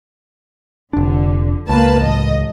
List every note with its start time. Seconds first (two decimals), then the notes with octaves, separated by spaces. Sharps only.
0.93 F1 D3 D4
1.69 C#2 A#3 B4 A5
2.01 A1 D#5